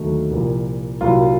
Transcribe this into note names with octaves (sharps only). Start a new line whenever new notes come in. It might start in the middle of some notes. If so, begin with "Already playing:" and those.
Already playing: D#2 D3 F#3 A3
C2 A#2 F3
C2 A#2 F#3 F4